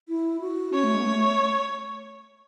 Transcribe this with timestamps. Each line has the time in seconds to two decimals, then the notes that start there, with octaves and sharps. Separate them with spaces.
0.08 E4
0.41 F#4
0.73 C#4 C#5
0.84 A3
0.94 G#3
1.00 B3
1.05 A3